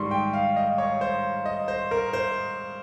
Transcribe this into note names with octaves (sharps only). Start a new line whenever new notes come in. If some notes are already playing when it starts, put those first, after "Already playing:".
Already playing: G#2 D#3 G3 C6 C#6
G5
F5
D#5
C#5
C5
D#5
C5
A#4
C5